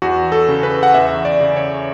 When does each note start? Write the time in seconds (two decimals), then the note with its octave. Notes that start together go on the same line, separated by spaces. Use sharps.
0.02 E2 F#4
0.32 A4
0.48 C#3
0.63 B4
0.83 F#5
0.94 E2 E5
1.25 D5
1.41 C#3
1.56 C#5